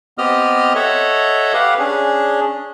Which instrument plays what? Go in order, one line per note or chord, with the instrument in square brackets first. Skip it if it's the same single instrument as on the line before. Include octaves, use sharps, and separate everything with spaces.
[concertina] B3 C4 G4 D#5 D#6 F6
A4 C#5 D#5 E5 F#5
G4 B4 F5 F#5
C#4 D4 G#4